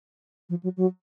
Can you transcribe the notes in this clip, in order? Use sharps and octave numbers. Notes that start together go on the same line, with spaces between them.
F3
F#3
F#3